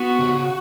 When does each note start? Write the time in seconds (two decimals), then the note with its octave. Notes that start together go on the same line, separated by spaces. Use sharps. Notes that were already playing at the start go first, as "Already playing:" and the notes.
Already playing: B3 F#4
0.19 C#3